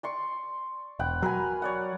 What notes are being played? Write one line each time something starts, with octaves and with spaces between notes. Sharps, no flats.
D5 C6 C#6
E1 F#5 G5 B5
F#3 A#4 B4 G#5
C#5 D5 F#5